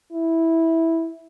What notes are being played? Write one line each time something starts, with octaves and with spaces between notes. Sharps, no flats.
E4